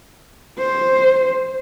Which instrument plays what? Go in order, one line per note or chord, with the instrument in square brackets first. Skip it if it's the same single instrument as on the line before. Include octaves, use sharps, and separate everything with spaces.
[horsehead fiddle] C5